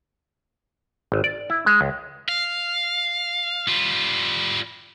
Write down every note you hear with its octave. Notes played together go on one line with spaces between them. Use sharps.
G#1
D5
E4
G#3
C#2
F5
G3 F4